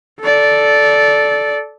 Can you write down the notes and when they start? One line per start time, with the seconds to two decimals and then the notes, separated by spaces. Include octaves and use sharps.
0.20 A4 D5